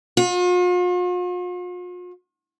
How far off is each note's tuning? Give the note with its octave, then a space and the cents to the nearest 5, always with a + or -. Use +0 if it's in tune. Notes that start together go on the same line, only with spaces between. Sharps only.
F4 +45